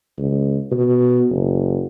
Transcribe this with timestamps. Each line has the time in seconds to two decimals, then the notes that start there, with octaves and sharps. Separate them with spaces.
0.18 C#2
0.72 B2
1.30 F#1